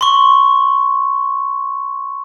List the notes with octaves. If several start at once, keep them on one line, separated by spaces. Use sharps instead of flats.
C6 C#6